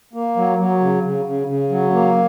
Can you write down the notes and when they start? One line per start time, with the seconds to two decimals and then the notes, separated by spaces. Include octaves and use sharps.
0.13 A#3
0.36 F#3
0.58 F#3
0.80 C#3
1.03 C#3
1.25 C#3
1.47 C#3
1.70 F#3
1.92 A#3